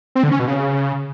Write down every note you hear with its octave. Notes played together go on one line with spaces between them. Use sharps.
C4
D3
C#4
B2
C#3